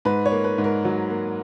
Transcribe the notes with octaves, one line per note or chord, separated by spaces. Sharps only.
G#2 B4
C#5
A#3
B4
G#2
A#4
F#3
A#3